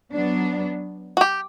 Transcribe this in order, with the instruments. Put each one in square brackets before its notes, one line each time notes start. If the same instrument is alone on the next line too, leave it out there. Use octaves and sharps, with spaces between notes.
[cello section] F#3 B3 D4
[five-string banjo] F#4
G4